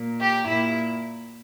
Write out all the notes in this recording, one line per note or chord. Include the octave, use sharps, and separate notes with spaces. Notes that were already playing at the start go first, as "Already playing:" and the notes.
Already playing: A#2
G4
A#2 E4